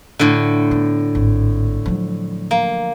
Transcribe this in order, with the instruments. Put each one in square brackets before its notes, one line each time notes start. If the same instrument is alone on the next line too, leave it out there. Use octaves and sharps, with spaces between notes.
[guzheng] A2 D3
[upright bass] B3
G#1
F3 F#3
[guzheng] A#3